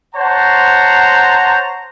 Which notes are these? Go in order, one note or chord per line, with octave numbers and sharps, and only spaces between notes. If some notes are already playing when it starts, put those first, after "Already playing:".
C5 C#5 F#5 A5 A#5